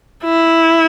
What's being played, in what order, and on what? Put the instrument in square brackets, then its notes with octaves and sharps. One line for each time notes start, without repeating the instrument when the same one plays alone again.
[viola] E4